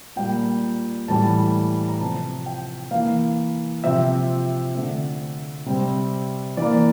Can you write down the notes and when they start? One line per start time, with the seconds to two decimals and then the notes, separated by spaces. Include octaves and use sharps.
0.16 A#2 G3 A#3 G5
1.08 A2 E3 G3 A5
1.88 A#5
2.00 C3 F3 C4 A5
2.46 G5
2.91 E3 A#3 F5
3.83 C3 F3 C4 E5
4.75 D3 A3 C4 E5
5.66 C3 G3 C4
6.57 E3 A#3 D5